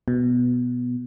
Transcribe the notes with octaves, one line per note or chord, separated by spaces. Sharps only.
B2